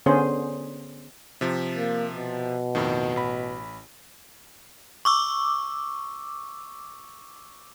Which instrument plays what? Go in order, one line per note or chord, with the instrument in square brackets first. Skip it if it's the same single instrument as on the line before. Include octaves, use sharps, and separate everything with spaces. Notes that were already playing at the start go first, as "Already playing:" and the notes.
[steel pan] D3 B3 C#4 G#4 C5
[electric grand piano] C3 F3
[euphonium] A#3
B2
[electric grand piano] F2 A2 D#3
A1 B5
[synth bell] C#6 D6 E6